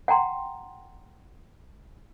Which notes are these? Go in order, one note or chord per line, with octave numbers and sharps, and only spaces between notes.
F#5 G5 A#5 C6